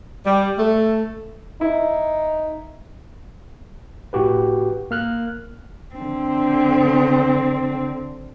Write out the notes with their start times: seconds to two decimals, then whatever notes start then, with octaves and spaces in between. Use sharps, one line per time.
0.25 G3
0.58 A3
1.61 D#4 E4
4.13 A2 F#4 G4 B4
4.91 A#3 F6 F#6
5.95 D3 C4